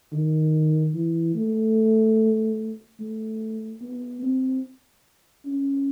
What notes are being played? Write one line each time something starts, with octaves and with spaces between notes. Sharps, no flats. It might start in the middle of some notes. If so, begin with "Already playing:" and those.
D#3
E3
A3
A3
B3
C4
C#4